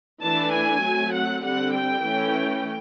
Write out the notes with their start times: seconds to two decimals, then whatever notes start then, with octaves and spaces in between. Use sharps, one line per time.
0.21 E3 A3 D4 A5
0.52 G#5
0.83 F#3 A3 C4
1.13 F#5
1.44 D3 G3 C4 F#5
1.74 G5
2.04 E3 A3 C#4